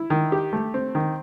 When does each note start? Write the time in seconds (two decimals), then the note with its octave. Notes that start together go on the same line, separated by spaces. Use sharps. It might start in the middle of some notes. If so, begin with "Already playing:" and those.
Already playing: E4
0.10 D#3
0.32 G4
0.53 A3
0.74 C4
0.95 D#3